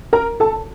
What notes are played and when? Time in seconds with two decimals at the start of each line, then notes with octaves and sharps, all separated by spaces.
0.13 A#4 A#5
0.40 A4 A5